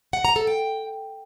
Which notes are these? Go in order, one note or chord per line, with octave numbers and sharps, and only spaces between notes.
F#5
A#5
A4
G5